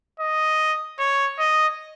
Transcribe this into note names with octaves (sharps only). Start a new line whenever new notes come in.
D#5
C#5
D#5